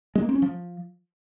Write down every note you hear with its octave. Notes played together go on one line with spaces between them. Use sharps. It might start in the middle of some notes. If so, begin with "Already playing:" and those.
G#3
A#3
C4
C#4
F3